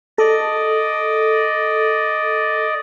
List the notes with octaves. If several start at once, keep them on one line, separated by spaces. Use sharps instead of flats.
A4 D5 D#5